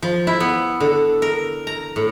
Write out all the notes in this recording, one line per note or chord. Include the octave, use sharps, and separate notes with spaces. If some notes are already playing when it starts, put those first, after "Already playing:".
F3
E4
B3
D3
A#4
A#5
A2